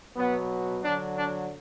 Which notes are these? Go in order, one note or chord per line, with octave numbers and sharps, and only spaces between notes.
B2 F#3 B3
D3 F#3 D4
D4